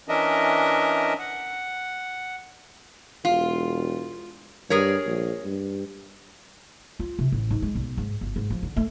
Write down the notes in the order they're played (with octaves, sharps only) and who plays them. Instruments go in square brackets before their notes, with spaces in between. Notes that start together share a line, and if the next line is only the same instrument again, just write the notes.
[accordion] E3 C#4 D4 A#4 D#5 E5
F#5
[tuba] E1 [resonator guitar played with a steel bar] F4
[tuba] G2 [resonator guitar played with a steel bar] G#4 A#4 C#5
[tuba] A#1
G2
[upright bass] F4
C3
A1
G#2
G#3
B1
G#2
G1
G#2
F3
D3
A3